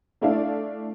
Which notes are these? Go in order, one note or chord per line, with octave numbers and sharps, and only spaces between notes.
A3 D4 E4 A4 D5 F5